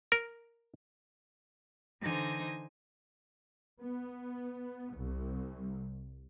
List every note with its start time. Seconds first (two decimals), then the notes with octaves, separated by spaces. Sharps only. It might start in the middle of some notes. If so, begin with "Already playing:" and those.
0.12 A#4
2.02 D3 E3 D#4 C5 G#5 A#6
3.83 B3
4.94 C2